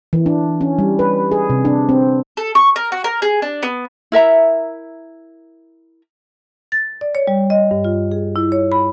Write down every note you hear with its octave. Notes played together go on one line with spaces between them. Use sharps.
E3
D4
C#4
G3
B4
G#4
C3
D4
C4
A4
C#6
A#4
F#4
A#4
G#4
D4
B3
E4 A#4 E5 A#5
A6
D5
C#5
G3
D#5
G2
F4
G#4
E4
C#5
B5